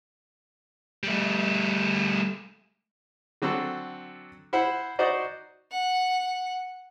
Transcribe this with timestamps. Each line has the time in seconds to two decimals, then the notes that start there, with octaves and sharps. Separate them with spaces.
1.03 G3 A3
3.42 D3 F#3 C4 A4
4.53 E4 C5 F#5
4.99 D#4 F#4 C5 D5 D#5
5.71 F#5